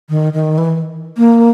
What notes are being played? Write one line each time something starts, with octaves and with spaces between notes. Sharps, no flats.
D#3
D#3
E3
A#3